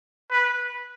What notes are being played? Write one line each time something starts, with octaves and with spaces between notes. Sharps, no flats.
B4